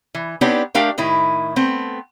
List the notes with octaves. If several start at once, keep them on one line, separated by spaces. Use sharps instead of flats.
E3
B3 C4 D4 D#4 G4 C#5
A3 D4 G4 A#4 F5 G5
A2 D#3 E4
A3 B3 C4